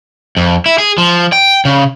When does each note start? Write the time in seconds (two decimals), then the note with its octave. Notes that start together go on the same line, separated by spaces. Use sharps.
0.37 F2
0.66 E4
0.78 G#4
0.98 F3
1.33 G5
1.65 C#3